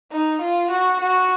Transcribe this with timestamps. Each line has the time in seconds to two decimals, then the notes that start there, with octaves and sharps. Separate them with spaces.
0.12 D#4
0.41 F4
0.70 F#4
1.00 F#4